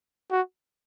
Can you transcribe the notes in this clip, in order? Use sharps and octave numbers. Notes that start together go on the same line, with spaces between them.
F#4